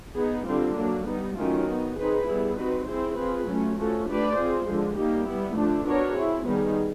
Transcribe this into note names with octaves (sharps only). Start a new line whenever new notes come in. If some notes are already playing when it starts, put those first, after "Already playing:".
B3 D#4 G#4
D3 G3 C4 F4
F#3 A#3 D4
G3 B3 D#4
D#3 F#3 A3 C#4 F4
B3 D#4 F#4
C4 D#4 G#4 B4
G3 B3 E4 G#4
C4 D#4 F#4 B4
C4 E4 G#4 C5
C4 F4 G#4 B4
F#3 A3 C#4 F4
F3 A3 C#4 F#4 A4
A3 D4 G4 B4 D5
C4 F4 G#4 C5
D3 F3 G#3
G3 A#3 D#4 G4
G3 B3 E4
D3 F3 A3 D4
B3 D4 F#4 A#4 C#5
C4 E4 G#4
D#3 G3 B3 D#4 G#4